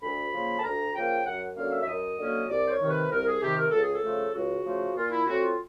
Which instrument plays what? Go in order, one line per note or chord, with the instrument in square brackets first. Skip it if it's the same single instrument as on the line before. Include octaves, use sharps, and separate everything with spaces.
[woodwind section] D2 B5
C#3 F3 A#3
A5
D2 A#5
C#3 F3 A#3 G5
F#2 F#5
D3 F#3 A#3 C#4 F5
E5
E5
F#2 D#5
D3 F#3 A#3 C#4
C2 D5
C5
C#5
C3 D#3
B4
C2 A#4
G#4
C3 D#3 G4
A#4
C#2 A4
G#4
A4
C#3 F3 A3
C#2 F#4
C#3 F3 A3
A#2 F4
E4
F#3 A3 C4 F#4
F4